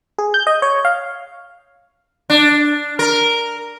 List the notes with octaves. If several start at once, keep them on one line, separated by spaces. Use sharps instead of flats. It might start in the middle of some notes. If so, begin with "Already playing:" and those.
G#4
G6
D#5
C#5
F5
D4
A#4